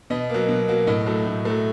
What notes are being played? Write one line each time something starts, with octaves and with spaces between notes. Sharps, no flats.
B2 D#5
F#3 A#3
B2
F#3 A#3
A2 D#5
F#3 A3
A2
F#3 A3